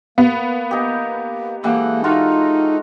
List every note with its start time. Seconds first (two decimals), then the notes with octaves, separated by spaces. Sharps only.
0.18 A#3 B3
0.71 D#4 G4
1.64 E3 G#3 A#3 G4 A4 D#5 F#5
2.04 D#4 F4 F#4 A#5